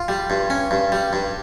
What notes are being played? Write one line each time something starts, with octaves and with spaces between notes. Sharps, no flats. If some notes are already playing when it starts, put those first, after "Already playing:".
Already playing: F4
G3
G2
C#4
G2
G3
G2